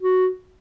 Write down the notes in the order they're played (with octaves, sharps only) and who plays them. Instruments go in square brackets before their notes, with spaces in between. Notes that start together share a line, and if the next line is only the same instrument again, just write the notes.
[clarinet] F#4